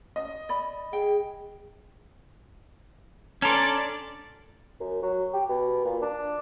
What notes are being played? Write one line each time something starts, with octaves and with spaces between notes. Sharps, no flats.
D#5
D5 B5
G#4 G5
C#4 D4 A4 D5 A5 A#5 C6
F#2
F#3
G4
B2
A#2
D4